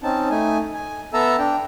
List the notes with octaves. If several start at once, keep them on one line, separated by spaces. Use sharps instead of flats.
C4 C#4 D#4 A5
A3 D#4 G#5
G#5
B3 A4 E5 A5 A#5 E6
D4 G5